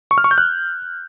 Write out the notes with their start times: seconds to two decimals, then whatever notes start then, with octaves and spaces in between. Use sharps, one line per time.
0.11 C#6
0.18 F6
0.24 C#6
0.31 G6
0.38 F#6